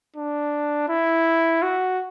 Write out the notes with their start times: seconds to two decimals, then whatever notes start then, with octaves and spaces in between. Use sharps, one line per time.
0.16 D4
0.89 E4
1.63 F#4